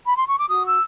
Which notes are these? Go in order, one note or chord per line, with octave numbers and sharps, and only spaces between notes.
B5
C6
C#6
D6
F#4 D#6
E6